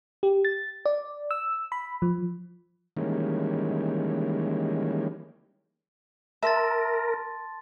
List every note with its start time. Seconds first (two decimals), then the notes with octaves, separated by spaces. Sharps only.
0.23 G4
0.45 A6
0.86 D5
1.31 E6
1.72 B5
2.02 F3
2.97 D#3 E3 G3 G#3 A#3 C#4
6.43 A#4 E5 A5 C6 A6